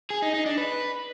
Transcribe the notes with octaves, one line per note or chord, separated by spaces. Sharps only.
G#4
D#4
D#4
D4
B4